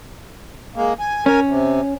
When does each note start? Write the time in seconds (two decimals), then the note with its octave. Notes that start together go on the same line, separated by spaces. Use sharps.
0.76 G#3 A#3
0.99 G#5
1.26 C#4 A#4 G#5
1.49 C3